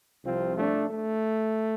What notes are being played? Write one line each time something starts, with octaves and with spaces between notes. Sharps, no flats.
C2 C3 F3 C4 F4
A3 D4
A3